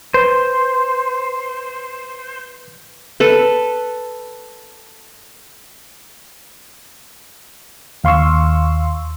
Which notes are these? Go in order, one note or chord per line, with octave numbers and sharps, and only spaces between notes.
B4 C5
A4 B4
D#2 F5 C6 C#6 E6